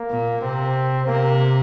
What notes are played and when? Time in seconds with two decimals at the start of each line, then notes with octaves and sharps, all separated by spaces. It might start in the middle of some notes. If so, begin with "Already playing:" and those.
Already playing: A#3
0.10 A#2
0.42 C3 C4
1.07 C3 A#3